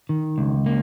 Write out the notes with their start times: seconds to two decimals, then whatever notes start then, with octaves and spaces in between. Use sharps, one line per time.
0.09 D#3
0.38 C#2
0.66 A#3